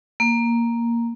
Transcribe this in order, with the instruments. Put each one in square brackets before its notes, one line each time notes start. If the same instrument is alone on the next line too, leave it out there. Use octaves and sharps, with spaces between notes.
[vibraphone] A#3